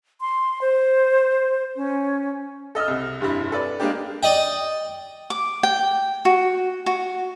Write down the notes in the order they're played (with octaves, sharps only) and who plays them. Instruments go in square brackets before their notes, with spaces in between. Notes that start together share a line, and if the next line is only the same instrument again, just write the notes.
[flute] C6
C5
C#4
[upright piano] A4 D#5 E6 F6
C2 C3
F1 G2 G3 E4
A4 B4 D5
G3 G#3 A#3 D4 G4
[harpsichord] D5 D#5 G5
[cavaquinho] D6
G5
F#4
F#4